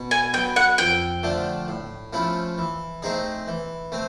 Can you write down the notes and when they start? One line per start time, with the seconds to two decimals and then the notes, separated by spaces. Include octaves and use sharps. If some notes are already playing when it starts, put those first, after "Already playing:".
Already playing: B2
0.11 G#5
0.33 B3 G5
0.37 F#3
0.56 F#5
0.78 F2 G5
1.23 D3 F3 A3 D4
1.68 A2
2.13 F3 A3 C#4 E4
2.58 E3
3.02 A3 C4 D#4 G#4
3.48 E3
3.92 A3 C4